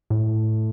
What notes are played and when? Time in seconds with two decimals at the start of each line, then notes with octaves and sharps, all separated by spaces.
0.10 A2